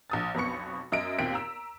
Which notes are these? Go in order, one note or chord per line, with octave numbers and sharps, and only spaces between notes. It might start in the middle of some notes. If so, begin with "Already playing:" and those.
A#1 D#6 A6
B1 F2 B3 B5 C#6 C#7
F#2 D#5 E5 D7
D#2 A#2 C4 B6 D7
A#5 E6